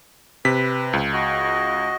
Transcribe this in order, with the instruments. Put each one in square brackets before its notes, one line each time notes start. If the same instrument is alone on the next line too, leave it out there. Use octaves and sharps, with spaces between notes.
[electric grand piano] C3 B6 [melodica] B4
[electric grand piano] C#2
[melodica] F#4 D#5